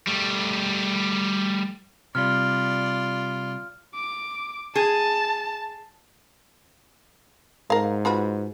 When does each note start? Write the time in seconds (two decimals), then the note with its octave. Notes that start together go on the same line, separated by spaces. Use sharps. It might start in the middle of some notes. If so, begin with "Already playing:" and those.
0.07 G3 A3
2.15 C3 G3 F4 D5 F6
3.95 D6
4.76 G#4 A5
7.70 G#2 A#4 F5
8.05 F4 F#4 B4